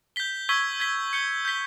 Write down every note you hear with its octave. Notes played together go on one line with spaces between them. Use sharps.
G6 B6 G7
C#6 E6 G#6 B6 G7
G#6 B6 G7
G6 C#7 G7
G6 B6 G7